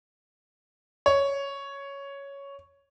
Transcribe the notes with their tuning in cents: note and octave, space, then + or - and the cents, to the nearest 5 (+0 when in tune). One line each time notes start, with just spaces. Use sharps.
C#5 +5